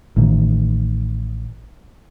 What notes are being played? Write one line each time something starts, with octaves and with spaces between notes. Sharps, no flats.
A1 A2 D#3